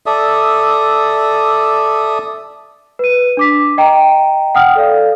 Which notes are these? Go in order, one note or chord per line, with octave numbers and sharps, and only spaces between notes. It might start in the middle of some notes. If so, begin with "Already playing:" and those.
A4 D5 E5 D#6
B4 D#7
D4 D6 B6
D#5 G5 A#5
F#5 G5 D#6 F6
A4 D5 F5